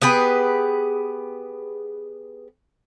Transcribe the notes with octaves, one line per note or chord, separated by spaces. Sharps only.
B3 G4 G#4 B4